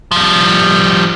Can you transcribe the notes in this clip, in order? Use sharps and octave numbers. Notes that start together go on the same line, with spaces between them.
F3 G3